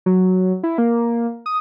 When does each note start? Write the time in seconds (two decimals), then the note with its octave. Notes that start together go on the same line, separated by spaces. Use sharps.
0.06 F#3
0.63 E4
0.78 A#3
1.46 D#6